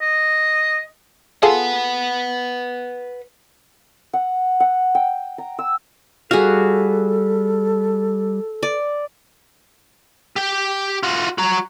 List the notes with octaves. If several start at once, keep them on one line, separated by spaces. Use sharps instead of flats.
D#5
F4 G#4 A4 B4 F#5
F#5
F#5
G5
A#5
E6
G3 F#4 G#4 A4 F5
D5
G4 G5
F4 F#4
F#4 A#5